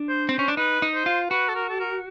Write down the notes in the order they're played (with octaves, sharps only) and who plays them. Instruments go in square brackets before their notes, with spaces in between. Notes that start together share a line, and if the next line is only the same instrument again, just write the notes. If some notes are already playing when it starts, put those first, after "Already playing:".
Already playing: [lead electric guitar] D4
[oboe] C5
[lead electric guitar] C4 [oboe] C5
[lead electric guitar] C#4
D4
[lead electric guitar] D#4 [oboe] B4
[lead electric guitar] D#4
[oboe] C5
[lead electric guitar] F4
[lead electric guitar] F#4 [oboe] B4
[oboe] A4
A#4
A4
A#4